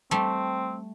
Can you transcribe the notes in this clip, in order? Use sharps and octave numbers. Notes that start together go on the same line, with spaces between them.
G3 A3 C4